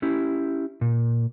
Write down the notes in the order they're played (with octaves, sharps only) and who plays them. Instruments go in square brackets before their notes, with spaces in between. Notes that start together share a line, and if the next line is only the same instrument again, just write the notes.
[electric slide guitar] C#4 E4 G4
A#2